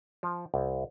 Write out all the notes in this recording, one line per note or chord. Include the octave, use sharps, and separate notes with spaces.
F3
C2